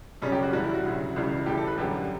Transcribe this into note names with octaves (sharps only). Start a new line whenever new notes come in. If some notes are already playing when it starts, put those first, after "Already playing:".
F#2 C#3 G3 C#4
G4
F#4
A2 E3 G3 F#4
E4
F#4
D2 C#3 F#3
C#2 C#3 E3 G3
A2 E3 G3 G4
A4
B4
F#2 D3 G3 G4